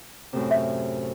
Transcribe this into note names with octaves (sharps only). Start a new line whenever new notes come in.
F#2 A2 C3
E5